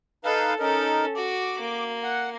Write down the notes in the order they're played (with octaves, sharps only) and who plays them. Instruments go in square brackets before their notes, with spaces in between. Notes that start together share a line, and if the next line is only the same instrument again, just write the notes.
[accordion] D#4 B4 F5 [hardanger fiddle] A4
[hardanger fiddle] C#4 A4 [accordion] D#4 A#4
[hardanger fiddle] F#4 [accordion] D6
[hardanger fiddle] A#3
[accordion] F#5